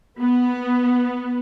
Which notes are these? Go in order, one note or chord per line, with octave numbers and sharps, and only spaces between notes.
B3